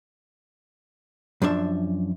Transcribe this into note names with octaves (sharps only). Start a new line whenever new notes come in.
F#2 F3 D4 E5